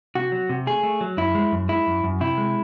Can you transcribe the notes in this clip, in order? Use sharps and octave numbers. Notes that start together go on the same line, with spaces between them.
C3 F#4
F#3
C3
A3 G#4
A3
F#3
F#2 E4
G#3
F#2
G#3 E4
F#2
F#2
C3 E4
G#3